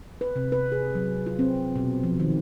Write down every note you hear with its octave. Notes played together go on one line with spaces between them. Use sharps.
B4
C3
B4
G#4
F#3
F4
C4
B2
F3
D#3